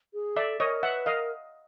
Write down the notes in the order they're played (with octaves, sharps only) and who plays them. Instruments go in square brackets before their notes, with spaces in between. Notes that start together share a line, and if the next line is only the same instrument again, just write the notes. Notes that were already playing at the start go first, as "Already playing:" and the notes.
[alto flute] G#4
[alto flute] A4 [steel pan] D5 E5
[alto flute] A#4 [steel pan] C#5 D#5
[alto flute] B4 [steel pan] E5 F#5
[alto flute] A#4 [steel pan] D#5 F5